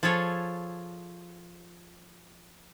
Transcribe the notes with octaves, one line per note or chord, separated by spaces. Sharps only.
F3 F4 G#4 A4 C#5